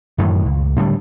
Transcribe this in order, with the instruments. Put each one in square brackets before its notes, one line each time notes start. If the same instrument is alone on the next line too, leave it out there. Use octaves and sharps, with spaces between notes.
[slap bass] F#2 A2 D#3 E3
C#2
A2 D3 G3